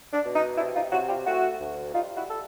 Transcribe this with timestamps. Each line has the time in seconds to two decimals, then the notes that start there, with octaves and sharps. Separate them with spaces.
0.13 D4
0.25 B2
0.36 D#4
0.58 C3 D4 E4
0.74 D#4 F4
0.92 C3 E4 F#4
1.09 F4 G4
1.25 A3 E4 F#4
1.60 D2
1.93 G3 D#4 F4
2.16 E4 F#4
2.30 A4